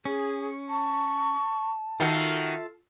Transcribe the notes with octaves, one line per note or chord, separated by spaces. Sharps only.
C#4 G#4
A5 C#6
D#3 D#4 F4 F#4 A4 E5 F5